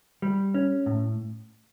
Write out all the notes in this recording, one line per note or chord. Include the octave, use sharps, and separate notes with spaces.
G3
C#4
A2